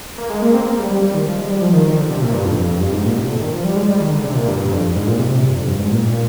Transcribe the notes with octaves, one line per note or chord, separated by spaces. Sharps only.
A#3
G#3
A#3
C4
A#3
G3
G3
G3
D#3
F3
G#3
G3
F3
D#3
D#3
D3
C3
A#2
G2
F2
F2
F2
G2
G#2
A#2
C3
D3
D#3
F3
G3
G#3
G3
D#3
D3
C3
A#2
G2
G2
F2
G#2
A#2
C3
C3
G2
F2
G2
G#2
A#2